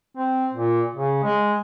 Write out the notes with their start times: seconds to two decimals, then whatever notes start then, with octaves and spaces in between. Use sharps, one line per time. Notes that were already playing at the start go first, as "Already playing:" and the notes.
0.17 C4
0.53 A#2
0.94 C#3
1.24 G#3